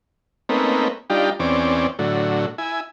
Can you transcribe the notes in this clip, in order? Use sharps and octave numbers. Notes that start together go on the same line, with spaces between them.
A3 A#3 C4 C#4 D#4 B4
G3 D4 D#4 F4 G4
E2 C4 C#4 D5
A2 D3 F#3
E4 G#5